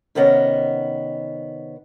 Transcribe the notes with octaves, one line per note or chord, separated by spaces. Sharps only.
C3 D#3 B3 C#4 D#5 F#5